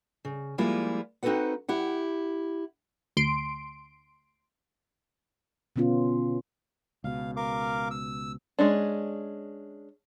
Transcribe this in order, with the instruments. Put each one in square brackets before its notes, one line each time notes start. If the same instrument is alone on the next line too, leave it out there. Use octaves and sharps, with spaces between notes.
[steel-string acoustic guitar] C#3
F3 G3 G#3 A#3 E4 F4
C4 D#4 F#4 A4 B4 F#5
E4 G4 F#5
[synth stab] D2 C6 D7
[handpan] B2 D3 B3 C#4 F4
[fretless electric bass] C#2 B2 [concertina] F5
[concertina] A#4 F5 D6
E6
[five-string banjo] G#3 C#4 D4